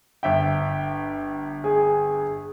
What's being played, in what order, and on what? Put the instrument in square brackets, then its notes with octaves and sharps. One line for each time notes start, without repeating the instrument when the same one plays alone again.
[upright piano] G1 E5 G5
[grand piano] G#4